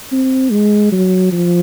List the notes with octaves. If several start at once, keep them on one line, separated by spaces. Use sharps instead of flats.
C4
G#3
F#3
F3